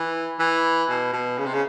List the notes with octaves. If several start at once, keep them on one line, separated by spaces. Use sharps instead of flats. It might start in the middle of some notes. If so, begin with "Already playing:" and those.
Already playing: E3
E3
B2
B2
C#3
C3
C#3